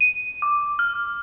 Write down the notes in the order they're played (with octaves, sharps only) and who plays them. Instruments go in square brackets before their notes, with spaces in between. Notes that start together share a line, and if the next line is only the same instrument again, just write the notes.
[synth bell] D#7
D6
F6